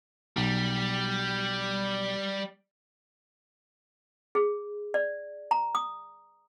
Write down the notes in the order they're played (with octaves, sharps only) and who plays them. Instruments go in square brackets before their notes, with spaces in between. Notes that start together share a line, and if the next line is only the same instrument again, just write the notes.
[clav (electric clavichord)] B1 [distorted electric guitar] G3
[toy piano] G#4
D5
A#5
D#6